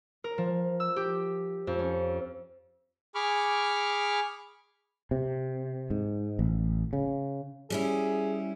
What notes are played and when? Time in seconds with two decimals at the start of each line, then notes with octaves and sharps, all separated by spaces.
0.24 A#4
0.38 F3
0.80 E6
0.96 G4
1.67 F2
1.79 C#4
3.15 G#4 B5 C#6 D6 F6
5.11 C3
5.90 G#2
6.39 A1
6.93 C#3
7.70 G3 C#4 E4 G#4